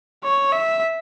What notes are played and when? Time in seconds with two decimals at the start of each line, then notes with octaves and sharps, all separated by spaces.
0.24 C#5
0.52 E5